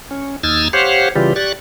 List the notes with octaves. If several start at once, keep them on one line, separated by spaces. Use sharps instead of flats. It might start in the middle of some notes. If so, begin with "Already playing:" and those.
C#4
D#2 D#4 E6 F6 G#6 A6
G4 C5 C#5 F5 F#5
C#3 E3 G3 F4 G4
G4 D5 C#6 F#6 A6